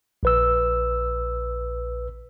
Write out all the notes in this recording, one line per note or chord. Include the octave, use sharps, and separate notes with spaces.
A#1 B4 E6